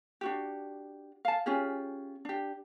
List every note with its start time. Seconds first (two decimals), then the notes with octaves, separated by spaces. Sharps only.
0.21 D4 F#4 G4
1.25 F5 A5
1.46 C#4 F4 G4 G#4
2.25 D4 G4